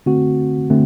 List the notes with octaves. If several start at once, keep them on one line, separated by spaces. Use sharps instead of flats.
D3 A3 C4 F#4
D3 A3 C4